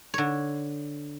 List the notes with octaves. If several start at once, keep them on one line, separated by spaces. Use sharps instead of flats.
D3 C#5